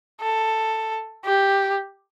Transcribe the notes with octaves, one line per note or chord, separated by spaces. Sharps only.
A4
G4